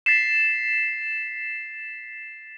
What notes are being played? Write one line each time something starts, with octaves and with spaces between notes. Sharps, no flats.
A6 B6 C7 E7